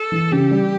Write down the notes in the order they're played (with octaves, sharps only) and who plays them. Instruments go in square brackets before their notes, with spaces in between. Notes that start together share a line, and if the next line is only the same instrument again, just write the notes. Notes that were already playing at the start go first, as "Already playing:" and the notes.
Already playing: [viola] A4
[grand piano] E3
[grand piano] C#3 [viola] G4
[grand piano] G3